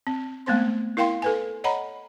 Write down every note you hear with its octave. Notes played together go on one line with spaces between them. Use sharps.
C4
G#3 A3 B3 C4 C5 C6
E4 A#4 F5 G5 C6
A4 B4 G#5
C#5 D#5 F#5 A#5 B5